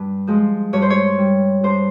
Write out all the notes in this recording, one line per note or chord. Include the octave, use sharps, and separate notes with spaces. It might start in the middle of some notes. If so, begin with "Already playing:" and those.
Already playing: G2
F3 G#3
G2 C#5
C5
C#5
G3
G2 C5